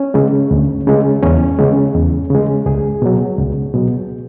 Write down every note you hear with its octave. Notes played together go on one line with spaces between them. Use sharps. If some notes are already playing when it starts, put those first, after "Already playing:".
Already playing: C#4
C#3 G#3
D2
C#3 G#3
E2 C#4
C#3 G#3
E2
C#3
G#3
C#2 G#4
B2 F#3
C#2
B2 F#3